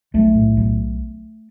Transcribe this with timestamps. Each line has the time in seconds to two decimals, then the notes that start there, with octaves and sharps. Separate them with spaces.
0.14 B1 A3
0.35 A2
0.57 B1